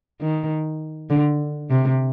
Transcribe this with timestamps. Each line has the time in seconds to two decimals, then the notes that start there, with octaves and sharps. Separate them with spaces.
0.21 D#3
1.10 D3
1.70 C3